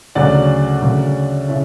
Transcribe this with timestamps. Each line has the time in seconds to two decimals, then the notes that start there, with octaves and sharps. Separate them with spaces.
0.15 D2 C#3 F#3 D5 F#5
0.82 D2 C#3 F#3
1.48 C#3 E3 C#5 E5